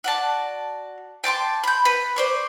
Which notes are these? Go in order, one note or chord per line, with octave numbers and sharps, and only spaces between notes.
F#4 D5 A5
G5 A5 C6 D6
B5 G6
B4
C5 D5 C#6